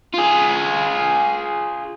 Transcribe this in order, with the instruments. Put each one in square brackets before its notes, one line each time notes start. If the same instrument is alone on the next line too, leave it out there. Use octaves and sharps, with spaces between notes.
[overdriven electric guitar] F4 G#4